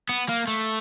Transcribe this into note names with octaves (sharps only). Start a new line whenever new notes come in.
B3
A#3
A3